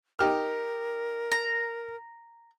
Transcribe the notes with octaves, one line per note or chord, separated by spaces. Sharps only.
D#4 G4 A#4 F6
A#5